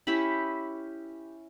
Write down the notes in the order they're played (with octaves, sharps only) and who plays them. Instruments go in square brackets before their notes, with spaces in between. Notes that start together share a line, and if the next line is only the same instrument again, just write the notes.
[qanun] C#4 E4 G4 B5